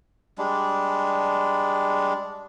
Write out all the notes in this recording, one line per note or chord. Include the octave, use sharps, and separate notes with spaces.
G3 G#3 D4